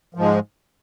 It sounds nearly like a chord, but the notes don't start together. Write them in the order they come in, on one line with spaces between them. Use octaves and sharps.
F3 G#2 G#3